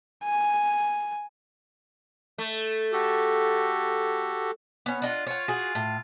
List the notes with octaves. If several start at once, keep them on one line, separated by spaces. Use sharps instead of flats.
G#5
A3
F#4 G4 A4
B3 C#4
D4 F4 D#5 F#5
F4 C#5 F#5
F#4 G#4
A2